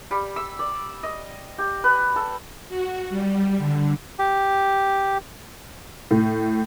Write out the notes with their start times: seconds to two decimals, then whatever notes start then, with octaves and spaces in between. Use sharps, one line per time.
0.11 G3
0.36 E6
0.59 D5
1.03 D#5
1.58 G4
1.84 B4
2.16 A4
2.69 F#4
3.09 G3
3.58 D3
4.19 G4
6.11 A2